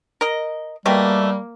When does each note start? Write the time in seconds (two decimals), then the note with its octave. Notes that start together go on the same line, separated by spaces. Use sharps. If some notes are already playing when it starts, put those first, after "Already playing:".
0.21 A#4 D#5
0.86 B2 G3 A3 A#3 G4